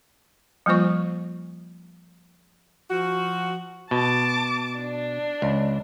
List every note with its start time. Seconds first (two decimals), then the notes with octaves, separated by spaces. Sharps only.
0.66 F3 G3 A#3 F4 C5 C#6
2.91 F3 F#4
3.91 B2 A5 D6
4.78 D4
5.42 C#2